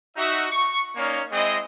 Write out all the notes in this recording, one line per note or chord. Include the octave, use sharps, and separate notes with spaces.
D#4 F#4 E5
C#6
A#3 C#4 D#4 C#5 D5 F5
G#3 C4 E4 D#5